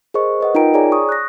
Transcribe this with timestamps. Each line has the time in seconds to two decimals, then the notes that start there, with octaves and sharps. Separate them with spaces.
0.14 G#4 A#4 C5 D#5 C#6
0.41 B4 D#5 F#5
0.55 D#4 F4 A#4 G5 A#5 D7
0.74 G#4 C#5 D5 G#5 A#5
0.92 C#6 D#6
1.09 F#6 A#6